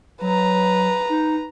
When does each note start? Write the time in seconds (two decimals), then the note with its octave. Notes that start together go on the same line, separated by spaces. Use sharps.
0.21 F#3 B4 A#5
1.09 D#4